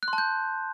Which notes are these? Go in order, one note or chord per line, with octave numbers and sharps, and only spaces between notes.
F#6
C6
A5
G6